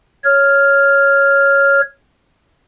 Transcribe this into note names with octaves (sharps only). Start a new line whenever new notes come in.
C#5 F6